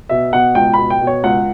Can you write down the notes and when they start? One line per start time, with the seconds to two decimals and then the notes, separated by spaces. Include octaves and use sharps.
0.09 B2 E5
0.33 B2 F#5
0.55 C#2 G5
0.74 B2 B5
0.90 G5
1.01 B2
1.07 C#5
1.24 C#2 F#5